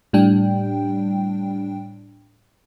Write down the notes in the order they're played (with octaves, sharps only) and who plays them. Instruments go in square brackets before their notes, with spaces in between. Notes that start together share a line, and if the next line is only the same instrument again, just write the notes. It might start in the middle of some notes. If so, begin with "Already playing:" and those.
[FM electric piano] A2 G3 D4 G5